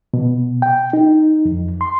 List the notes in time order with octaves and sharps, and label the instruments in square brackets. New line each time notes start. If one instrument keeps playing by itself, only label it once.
[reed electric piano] B2
G5
D#4
F2
C6